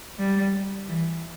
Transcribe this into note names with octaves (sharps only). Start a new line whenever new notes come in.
G3
E3